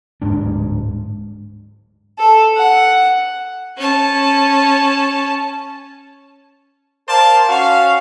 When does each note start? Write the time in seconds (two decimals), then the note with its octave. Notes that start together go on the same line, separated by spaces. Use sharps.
0.22 D1 G#2 G#3 D4
2.19 A4
2.58 F#5
3.76 C#4 A5
7.08 A#4 C5 D5 F5 A5
7.49 C#4 F#4 F5